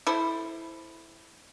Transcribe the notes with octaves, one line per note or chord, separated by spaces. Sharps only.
E4 A4 C5